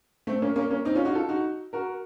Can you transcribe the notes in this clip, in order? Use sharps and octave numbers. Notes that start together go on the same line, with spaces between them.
A3 C4
A#3 C#4
A#3 C#4
A#3 C#4
C4 D#4
C#4 F4
D#4 F#4
F4 A4
D#4 F#4
F#4 A#4